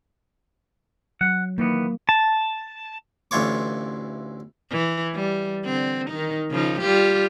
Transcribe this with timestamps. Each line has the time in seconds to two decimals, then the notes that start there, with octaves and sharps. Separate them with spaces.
1.21 F#3 F#5
1.58 D#3 E3 A#3 B3
2.09 A5
3.31 A1 D2 E3 F4 C#5 D6
4.71 E3
5.15 G3
5.65 D3 C4
6.10 D#3 D#4
6.51 C#3 F3 D#4
6.81 G3 F4 G4